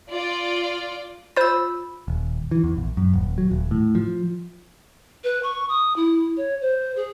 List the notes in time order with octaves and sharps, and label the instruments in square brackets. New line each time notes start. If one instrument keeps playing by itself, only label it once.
[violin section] F4 D5
[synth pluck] F4 C5 [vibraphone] B5 E6
[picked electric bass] D#1
E3
E2
A#1
F#2
D#1
F#3
D#1
A2
F3
[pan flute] B4
C#6
D#6
E4
C#5
C5
G#4